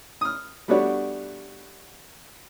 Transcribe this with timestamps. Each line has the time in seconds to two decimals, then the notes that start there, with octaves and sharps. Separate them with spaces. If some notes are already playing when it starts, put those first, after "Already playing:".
0.21 D#6 F6
0.68 G3 A3 B3 D4 F#4 C#5